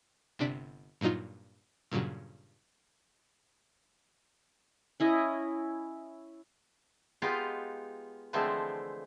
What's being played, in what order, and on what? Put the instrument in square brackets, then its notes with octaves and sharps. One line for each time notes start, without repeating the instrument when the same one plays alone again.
[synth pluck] G1 C3 D4 D5 B6
G2 A#2 F#3 D#4 F4
G2 A#2 C#3 F#3
[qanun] C#4 E4 D#5
[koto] G#3 B3 D#4 F4 G4 F5
D3 E3 F3 G#3 A3 C4